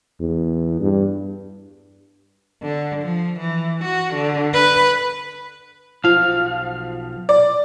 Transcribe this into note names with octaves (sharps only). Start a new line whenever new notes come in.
E2
G2
D3
F3
E3
F#4
D3
B4
B1 F3 F5
D5